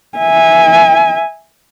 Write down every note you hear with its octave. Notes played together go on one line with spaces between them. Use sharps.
E5 G#5